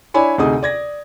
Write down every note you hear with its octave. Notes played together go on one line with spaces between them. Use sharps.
D4 E4 C#5 G#5 B5
D2 C3 D#4 G#4 D#6
D5 G#6 A#6